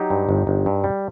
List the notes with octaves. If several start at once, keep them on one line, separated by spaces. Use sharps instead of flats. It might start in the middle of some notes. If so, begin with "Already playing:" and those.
Already playing: F#3 D#4 G4
G2
G1
G1
G2
G3